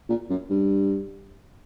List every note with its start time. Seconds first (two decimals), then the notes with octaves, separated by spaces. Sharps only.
0.09 A#2
0.30 F#2
0.50 G2